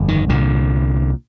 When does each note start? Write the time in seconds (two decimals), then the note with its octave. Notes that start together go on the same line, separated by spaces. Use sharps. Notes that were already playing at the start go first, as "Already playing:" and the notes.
Already playing: G1 F2
0.08 D#3
0.29 C2 A#2 D3